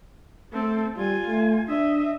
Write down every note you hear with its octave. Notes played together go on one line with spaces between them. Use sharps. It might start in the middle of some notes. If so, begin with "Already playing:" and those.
A3 C4 A4
G3 F4 G#5
A3
D4 D#5 E5